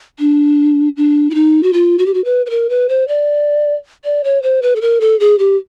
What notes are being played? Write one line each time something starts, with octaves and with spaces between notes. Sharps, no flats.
D4
D4
E4
D#4
F#4
F4
F#4
G4
F#4
B4
B4
A#4
B4
C5
D5
D5
C#5
C5
B4
A4
A#4
A4
G#4
G4